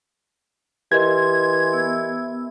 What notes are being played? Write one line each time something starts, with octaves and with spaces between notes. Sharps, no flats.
E3 G4 A#4 D#5 C6 G#6
B3 E5 E6